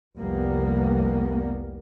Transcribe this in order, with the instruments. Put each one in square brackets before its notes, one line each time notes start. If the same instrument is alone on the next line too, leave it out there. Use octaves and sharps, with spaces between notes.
[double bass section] F1 C2 G3 A#3 B3